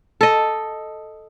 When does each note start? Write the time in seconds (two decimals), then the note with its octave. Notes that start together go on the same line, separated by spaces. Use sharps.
0.21 A4 D#5